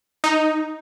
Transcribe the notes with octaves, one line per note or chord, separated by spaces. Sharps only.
D#4